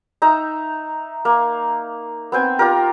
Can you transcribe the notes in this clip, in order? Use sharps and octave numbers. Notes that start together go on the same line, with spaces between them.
D#4 E5 A#5
A#3
B3 C4 G5 G#5
F4 G4 A#4